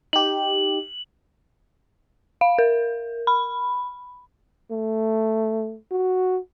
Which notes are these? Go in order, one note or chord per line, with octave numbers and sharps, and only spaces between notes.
D#4 G4 F#7
F5
A#4
B5
A3
F#4